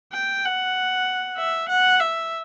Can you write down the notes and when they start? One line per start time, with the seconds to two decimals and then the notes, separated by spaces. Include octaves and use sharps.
0.13 G5
0.45 F#5
1.38 E5
1.69 F#5
2.00 E5